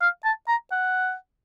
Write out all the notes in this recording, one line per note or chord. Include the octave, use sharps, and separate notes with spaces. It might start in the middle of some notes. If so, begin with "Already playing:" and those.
F5
A5
A#5
F#5